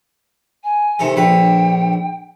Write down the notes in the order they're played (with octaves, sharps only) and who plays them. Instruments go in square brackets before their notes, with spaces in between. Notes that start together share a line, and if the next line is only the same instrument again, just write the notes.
[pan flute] G#5
[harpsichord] C3 D#3 A4
[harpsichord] A#1 D3 B4 [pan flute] G5